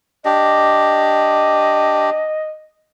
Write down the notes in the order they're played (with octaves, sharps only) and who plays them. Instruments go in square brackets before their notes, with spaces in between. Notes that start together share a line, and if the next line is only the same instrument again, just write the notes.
[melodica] D4 G4 [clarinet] D#5